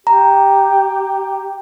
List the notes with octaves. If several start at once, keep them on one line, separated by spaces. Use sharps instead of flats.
G4 A#5